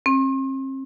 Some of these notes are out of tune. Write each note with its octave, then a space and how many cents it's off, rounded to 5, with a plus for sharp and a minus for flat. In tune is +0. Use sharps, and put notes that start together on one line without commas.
C4 +40